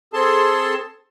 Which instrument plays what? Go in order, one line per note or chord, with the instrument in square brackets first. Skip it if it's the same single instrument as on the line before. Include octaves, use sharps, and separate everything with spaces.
[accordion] C4 G#4 A4 A5 C6